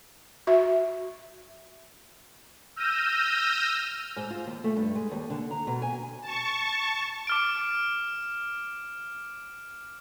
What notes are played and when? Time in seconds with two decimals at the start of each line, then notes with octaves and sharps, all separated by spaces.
0.47 F#4 E5
2.76 E6 F6 G6 A#6 D#7
4.16 G#2
4.30 F4
4.46 D#2
4.64 A3
4.76 G2
4.95 G#3
5.11 D#2
5.30 D3
5.51 A#5
5.67 B2
5.82 G#5
6.21 A5 C#6
7.27 D6 F6 D7